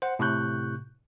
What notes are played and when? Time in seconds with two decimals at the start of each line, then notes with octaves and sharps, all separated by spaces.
0.02 C5 F#5
0.19 A2 C3 C#6 F#6 G6